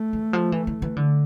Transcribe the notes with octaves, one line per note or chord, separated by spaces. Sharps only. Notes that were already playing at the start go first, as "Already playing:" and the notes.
Already playing: A3
E3
F3
E3
E3
E3
D3